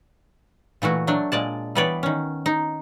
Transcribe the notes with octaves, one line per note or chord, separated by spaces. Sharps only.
A#2 E3 A3 F#4
F#3 A3 D4
A#2 G#3 D5 A5
E3 G3 B3 B4 C#5 D5
D#3 C#4
D#4